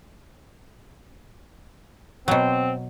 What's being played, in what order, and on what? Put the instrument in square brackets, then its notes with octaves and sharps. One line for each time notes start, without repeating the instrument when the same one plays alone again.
[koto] B2 F#3 [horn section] C4